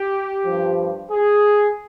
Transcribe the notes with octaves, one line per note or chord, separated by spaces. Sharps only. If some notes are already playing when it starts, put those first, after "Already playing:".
Already playing: G4
G2 F3
G#4